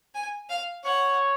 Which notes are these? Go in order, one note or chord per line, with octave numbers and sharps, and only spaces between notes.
G#5
F5
C#5 F#5